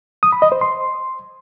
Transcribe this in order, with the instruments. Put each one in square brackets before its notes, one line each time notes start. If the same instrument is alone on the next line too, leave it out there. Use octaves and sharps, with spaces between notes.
[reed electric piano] D#6
B5
D#5
C5
C6